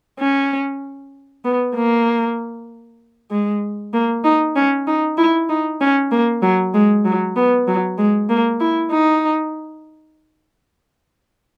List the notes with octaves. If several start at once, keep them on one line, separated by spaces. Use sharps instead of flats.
C#4
B3
A#3
G#3
A#3
D#4
C#4
D#4
E4
D#4
C#4
A#3
F#3
G#3
F#3
B3
F#3
G#3
A#3
E4
D#4